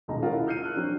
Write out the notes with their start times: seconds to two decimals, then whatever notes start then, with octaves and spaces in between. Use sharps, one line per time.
0.08 D#1 B1 G#3 D#4 A#5
0.22 C#4 F4 G#4 A#4 F#5
0.34 E4
0.47 E6 F6 G6 C7 C#7 D#7
0.62 A5 F6 F#6
0.75 F#3 C4 D4